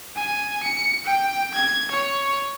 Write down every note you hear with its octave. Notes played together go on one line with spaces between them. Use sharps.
G#5
C#7
G5
G#6
C#5